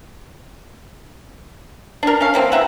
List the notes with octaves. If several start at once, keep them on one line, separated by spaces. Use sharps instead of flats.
D4 A#4
C#4 F5
E3 A#3 C4
C3 B4 E5 F#5